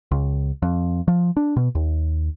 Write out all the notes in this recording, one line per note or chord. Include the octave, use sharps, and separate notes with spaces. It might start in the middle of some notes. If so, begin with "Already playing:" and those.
C#2
F2
F3
D4
B2
D#2